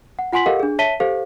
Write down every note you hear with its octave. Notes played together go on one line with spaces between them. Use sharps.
F#5
F4 F#5 G#5 C6 B6 F#7
G4 A4 A#4 D#5 F5 F#5
D4 G#4
C#5 E5 A5 B6 D#7 G7
G4 A4 C5 F5